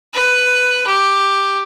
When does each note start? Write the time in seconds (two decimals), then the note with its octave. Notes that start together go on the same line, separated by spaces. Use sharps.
0.14 B4
0.87 G4